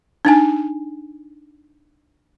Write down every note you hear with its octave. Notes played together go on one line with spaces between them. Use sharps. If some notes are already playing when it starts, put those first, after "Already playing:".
D4 D#4 G#5